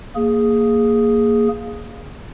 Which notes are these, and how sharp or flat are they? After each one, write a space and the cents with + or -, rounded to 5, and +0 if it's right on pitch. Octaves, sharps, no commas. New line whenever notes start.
A#3 -5 G#4 +0